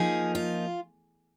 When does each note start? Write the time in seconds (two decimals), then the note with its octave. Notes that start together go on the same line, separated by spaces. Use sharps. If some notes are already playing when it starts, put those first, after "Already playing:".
Already playing: F3 A#3 D#4 G#4
0.35 F4